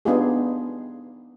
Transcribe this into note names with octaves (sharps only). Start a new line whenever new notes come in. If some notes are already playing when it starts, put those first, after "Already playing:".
B3 D4 D#4 F4 G4 G#4